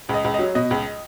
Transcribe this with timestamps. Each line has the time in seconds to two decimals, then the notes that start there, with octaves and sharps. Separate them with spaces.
0.09 C#2 D#5
0.24 C#2
0.34 F#3 D#5
0.55 B2 D#5
0.71 C#2